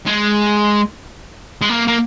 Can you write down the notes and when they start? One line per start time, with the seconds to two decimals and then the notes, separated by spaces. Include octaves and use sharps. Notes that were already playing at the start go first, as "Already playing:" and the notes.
0.06 G#3
1.61 G#3
1.69 A#3
1.88 A#3